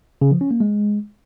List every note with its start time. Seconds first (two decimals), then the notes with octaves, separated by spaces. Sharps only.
0.21 C#3
0.31 F3
0.41 C#4
0.51 A#3
0.60 G#3